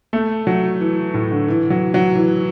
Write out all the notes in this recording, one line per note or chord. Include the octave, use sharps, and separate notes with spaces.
A3
F#3
E3
A2
D3
E3
F#3
F#3
E3